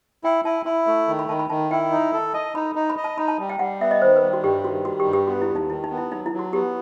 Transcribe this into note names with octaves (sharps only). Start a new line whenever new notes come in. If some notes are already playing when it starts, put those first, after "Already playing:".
E4 G5
E4 A5
E4 B5
A3
D#3
B5
D#3 A5
B5
D#3 A5
E4 G5
D#4
A4
D#5 A5
D#4 B5
D#4
B5
D#5
A5
D#4 B5
A5
G3
G5
G3 F#5
B3 E5
D#5
D#3 C5
B4
G3
F#4
G2 G4
D#3 F#4
G3 F#4
G4
G2
G4
B3 F#4
E4
D#2
D#4
D#3 E4
D#4
B3
E4
F#3 D#4
E4
F#3
F#4
B3 G4